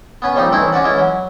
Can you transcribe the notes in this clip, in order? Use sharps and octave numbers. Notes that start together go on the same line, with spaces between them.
B3 C#4 B4
C#2 F3 G3 C4 D#4
E3 A3 C4 C#4 D#4 E4
C#4 F#4 D5 F#5
E3 G#3 C#4 E4
F#3